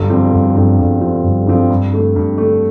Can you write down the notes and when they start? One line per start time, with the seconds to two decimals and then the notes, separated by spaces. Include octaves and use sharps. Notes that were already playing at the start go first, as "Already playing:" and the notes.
Already playing: G1
0.10 G2 D3 F3 C4
0.33 G1
0.55 G2 D3 F3 C4
0.79 G1
1.01 G2 D3 F3 C4
1.23 G1
1.47 G2 D3 F3 C4
1.70 G2
1.93 D3 A3
2.16 G2
2.38 D3 A3